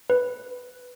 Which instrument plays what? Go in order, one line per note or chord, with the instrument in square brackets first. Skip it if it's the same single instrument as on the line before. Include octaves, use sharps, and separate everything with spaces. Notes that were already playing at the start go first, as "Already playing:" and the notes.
[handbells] B4